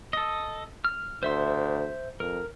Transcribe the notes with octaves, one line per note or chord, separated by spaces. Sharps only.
A4 D#5
F6
D2 C5 E5 C6
F2 A#4